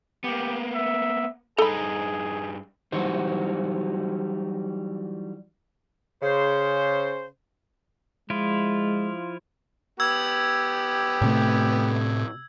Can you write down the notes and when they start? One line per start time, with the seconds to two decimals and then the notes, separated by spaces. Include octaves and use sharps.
0.24 A#3 B3 G4
0.75 E5
1.58 G2 D#4 G#4 A4 A#5 B5
2.92 E3 F#3 G3 D#4 F#4 C5
6.23 C#3 C5
8.30 F3 G#3 E4 F4
10.00 B3 G4 E6 G#6
11.22 A2 C3 A3